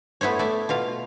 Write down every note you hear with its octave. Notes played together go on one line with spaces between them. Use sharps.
A3 B3 E4 C5 C#5
A3 D5 E5
B2 F4 F5